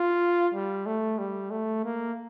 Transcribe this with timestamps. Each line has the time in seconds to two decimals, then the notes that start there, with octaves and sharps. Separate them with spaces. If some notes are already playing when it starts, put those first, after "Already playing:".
Already playing: F4
0.54 G3
0.86 A3
1.18 G3
1.51 A3
1.84 A#3